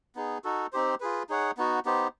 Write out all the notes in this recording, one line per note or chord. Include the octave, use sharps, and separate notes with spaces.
B3 D#4 G#4
D#4 F#4 A4
C4 D#4 G4 C5
F4 G#4 B4
D#4 G#4 C#5 F#5
B3 D#4 F#4
B3 D#4 G4 C5